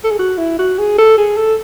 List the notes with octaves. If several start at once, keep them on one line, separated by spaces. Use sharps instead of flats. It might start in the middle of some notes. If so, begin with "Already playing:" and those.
A4
G#4
F#4
E4
F#4
G#4
A4
G#4
A4